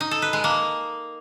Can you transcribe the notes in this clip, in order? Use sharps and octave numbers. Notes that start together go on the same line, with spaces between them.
D#4
A4
B4
G#3
A#3